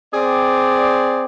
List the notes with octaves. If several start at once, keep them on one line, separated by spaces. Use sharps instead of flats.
C4 G#4 D5